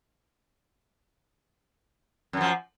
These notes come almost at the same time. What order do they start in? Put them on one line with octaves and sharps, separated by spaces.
F#2 E3 F3